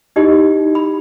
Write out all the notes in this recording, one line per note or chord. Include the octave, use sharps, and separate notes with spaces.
D#4 E4 G4 D#5
B5